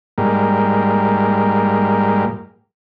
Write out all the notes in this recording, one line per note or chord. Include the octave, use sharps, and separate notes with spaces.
G#2 G3 A#3